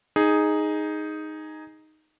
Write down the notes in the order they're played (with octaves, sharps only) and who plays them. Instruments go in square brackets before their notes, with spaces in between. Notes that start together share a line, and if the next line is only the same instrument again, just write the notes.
[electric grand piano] D#4 G#4